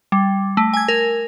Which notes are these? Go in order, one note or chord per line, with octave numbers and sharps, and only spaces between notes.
G3
A3
G#5 G#6
A#4